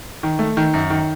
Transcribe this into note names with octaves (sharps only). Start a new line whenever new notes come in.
D#3
A3
D#3
F#2
D#3